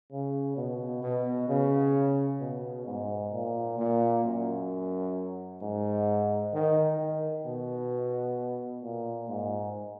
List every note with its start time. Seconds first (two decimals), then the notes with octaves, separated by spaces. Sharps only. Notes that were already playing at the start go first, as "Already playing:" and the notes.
0.12 C#3
0.57 B2
1.03 B2
1.49 C#3
2.41 B2
2.86 G#2
3.33 A#2
3.78 A#2
4.24 F#2
5.61 G#2
6.54 D#3
6.99 D#3
7.45 B2
8.83 A#2
9.28 G#2